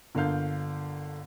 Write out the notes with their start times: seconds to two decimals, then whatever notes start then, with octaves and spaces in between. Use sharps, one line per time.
0.15 G1 D3 A#3 F5 G6